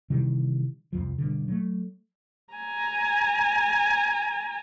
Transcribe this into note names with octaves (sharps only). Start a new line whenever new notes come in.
C3 D#3 E3 G3
C2 F2 F3
G2 B2 D3
F#3 A3
G#5 A#5